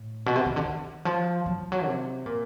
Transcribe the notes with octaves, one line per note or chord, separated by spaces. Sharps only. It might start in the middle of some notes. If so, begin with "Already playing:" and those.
Already playing: A2
B2
C3
C#3
D3
D#3
F3
F#3
F3
F#3
C3
A#2